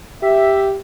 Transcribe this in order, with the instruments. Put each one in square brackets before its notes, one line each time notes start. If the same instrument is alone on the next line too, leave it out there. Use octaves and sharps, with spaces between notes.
[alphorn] G4 [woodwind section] E5